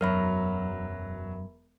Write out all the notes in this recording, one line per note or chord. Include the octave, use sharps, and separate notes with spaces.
E1 F#2 F#3 A#4 E5 B5 F6